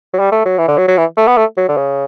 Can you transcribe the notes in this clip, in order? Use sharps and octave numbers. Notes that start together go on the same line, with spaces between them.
F#3
G3
A3
F#3
E3
D3
F#3
F#3
E3
A3
B3
A3
F#3
D3
C#3